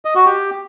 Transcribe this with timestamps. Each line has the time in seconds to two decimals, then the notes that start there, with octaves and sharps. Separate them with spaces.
0.05 D#5
0.15 F#4
0.26 G4